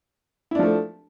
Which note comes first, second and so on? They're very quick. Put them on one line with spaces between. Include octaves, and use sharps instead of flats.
E4 D4 F3 A3